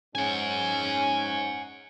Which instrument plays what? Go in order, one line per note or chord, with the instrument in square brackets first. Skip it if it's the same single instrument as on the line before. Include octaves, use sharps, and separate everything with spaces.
[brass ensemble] G#2 C#4 [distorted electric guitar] F#5 G#5